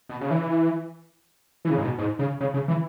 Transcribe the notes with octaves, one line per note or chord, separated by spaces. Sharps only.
B2
C#3
E3
E3
C#3
G#2
B2
G#2
C#3
C#3
C#3
E3